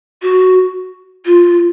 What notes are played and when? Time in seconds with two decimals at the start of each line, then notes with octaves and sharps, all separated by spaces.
0.22 F#4
1.26 F4